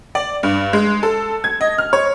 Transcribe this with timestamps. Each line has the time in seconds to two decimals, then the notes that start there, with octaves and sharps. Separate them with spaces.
0.15 D5
0.43 G2
0.73 G#3
1.03 A4
1.44 G#6
1.61 D#5
1.78 F6
1.93 C#5